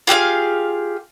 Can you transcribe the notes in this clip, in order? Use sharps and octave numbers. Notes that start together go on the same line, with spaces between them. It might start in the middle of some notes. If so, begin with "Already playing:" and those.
F4 G4 G#4 F5